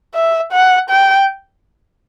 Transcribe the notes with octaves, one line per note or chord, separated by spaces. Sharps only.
E5
F#5
G5